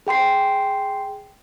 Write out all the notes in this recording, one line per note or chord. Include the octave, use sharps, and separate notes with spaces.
G#4 G5 C6 C7